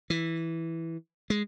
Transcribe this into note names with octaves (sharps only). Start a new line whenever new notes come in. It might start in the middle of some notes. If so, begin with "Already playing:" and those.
E3
G#3